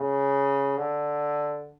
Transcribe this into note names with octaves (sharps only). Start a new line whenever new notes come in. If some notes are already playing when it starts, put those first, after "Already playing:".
Already playing: C#3
D3